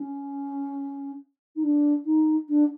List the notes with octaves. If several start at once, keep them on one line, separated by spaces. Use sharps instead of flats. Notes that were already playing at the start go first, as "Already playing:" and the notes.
Already playing: C#4
D#4
D4
D#4
D4